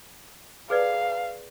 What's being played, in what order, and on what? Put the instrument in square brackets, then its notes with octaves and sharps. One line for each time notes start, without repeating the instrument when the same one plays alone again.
[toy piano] G#4 B4 D5 [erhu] F5